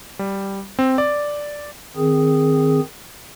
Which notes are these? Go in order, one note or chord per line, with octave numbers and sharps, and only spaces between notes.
G3
C4
D5
D#3 C4 G#4